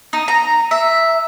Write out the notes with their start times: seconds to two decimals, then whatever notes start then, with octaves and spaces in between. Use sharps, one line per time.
0.13 D#4
0.28 A#5
0.71 E5